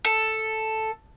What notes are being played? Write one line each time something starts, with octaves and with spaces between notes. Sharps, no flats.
A4